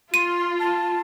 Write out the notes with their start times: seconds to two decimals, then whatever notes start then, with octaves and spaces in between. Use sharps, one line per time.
0.14 F4 C6 D#7
0.59 A5